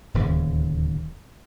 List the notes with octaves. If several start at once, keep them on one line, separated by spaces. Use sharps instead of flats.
D1 D#2 C#3